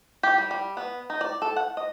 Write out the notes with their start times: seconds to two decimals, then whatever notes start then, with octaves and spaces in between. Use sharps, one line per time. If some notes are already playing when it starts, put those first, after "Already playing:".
0.23 G4
0.38 G3
0.51 G3
0.77 B3
1.10 D#4
1.21 D5
1.42 A4
1.56 F#5
1.77 D#5